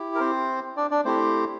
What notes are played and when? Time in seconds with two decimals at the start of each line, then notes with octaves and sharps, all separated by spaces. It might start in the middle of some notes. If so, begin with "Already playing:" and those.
Already playing: E4 G4
0.15 A#4
0.20 C4 C5
0.77 D4 D5
0.91 D4 D5
1.05 A3 C4 E4 G4 C5